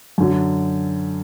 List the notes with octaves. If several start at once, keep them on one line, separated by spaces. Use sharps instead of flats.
F#2 D3 F#3